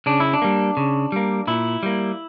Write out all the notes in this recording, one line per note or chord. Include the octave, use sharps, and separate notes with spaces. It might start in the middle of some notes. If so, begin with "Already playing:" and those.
C#3 D4
E4
D4
G3 A#3
C#3
G3 A#3
A#2 E4
G3 A#3